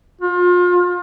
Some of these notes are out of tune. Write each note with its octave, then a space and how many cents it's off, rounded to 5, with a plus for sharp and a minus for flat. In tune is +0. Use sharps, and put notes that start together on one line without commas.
F4 +35